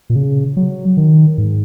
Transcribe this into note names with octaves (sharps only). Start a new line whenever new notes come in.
A#2
C#3
F#3
D#3
G#2